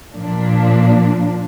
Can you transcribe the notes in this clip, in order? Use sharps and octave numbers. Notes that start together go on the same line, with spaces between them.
A#2 F3 A#3 D4